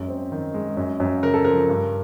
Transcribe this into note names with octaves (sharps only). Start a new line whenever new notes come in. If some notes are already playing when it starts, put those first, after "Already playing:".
Already playing: F#2 G#3
C4
D#3
G#3
F#2
F#2
C#3 A#4
A4
F3 A#4
G2